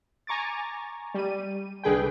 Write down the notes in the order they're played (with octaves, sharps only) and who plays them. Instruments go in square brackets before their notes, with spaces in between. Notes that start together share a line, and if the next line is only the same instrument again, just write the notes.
[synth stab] G#5 A#5 C#6 D6 A6
G3 D#7
C2 D3 G#4 B4 G5